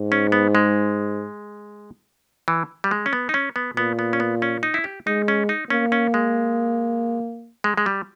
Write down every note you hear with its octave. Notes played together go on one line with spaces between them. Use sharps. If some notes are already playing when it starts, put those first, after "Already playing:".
Already playing: G#2
C#4
B3
G#3
E3
G3
G#3
C#4
B3
D#4
C#4
B3
A#2 B3
B3
C#4
B3
C#4
D#4
E4
G4
G#3 D#4
C#4
D#4
A#3 C#4
C#4
G#3
G#3
G#3
G3